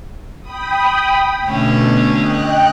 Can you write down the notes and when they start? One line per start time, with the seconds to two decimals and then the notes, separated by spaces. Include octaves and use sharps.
0.41 G5 B5 D#6
1.46 B2 D3 A3 C#4
2.18 D#5 G5 F#6